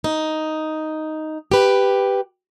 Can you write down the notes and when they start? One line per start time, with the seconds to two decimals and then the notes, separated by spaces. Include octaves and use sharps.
0.04 D#4
1.52 G4 B4